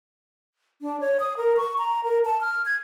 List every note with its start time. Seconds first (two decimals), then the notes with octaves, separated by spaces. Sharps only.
0.82 D4
1.00 C#5
1.20 D#6
1.37 A#4
1.57 C#6
1.78 A#5
2.04 A#4
2.25 A5
2.41 F6
2.65 G#6